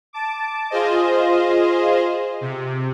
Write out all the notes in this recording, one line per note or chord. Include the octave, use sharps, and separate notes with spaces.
A5 D6
F4 G#4 C5 D#5
C3